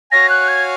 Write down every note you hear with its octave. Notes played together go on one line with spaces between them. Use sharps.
F#4 C#5 F5 G#5 A#6
F#6
G#6